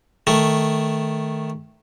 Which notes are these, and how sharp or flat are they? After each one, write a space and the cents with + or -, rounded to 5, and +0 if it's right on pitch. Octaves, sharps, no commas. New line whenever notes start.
D#3 +0 A3 +0